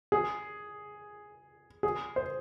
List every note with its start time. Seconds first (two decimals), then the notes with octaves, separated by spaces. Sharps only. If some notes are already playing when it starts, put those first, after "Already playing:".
0.12 G#4
1.83 G#4
2.16 C5